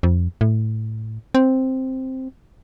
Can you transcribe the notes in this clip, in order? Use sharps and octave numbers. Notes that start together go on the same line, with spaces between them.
F2
A2
C4